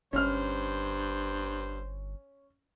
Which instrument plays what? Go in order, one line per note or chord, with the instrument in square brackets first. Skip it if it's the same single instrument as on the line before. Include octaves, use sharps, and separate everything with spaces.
[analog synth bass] G1 [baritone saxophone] G2 [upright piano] C#4 F6 [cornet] C5